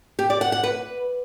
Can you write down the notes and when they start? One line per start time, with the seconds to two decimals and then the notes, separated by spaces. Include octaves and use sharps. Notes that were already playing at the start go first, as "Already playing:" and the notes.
0.19 G4
0.30 D5
0.41 F#5
0.52 F#5
0.64 B4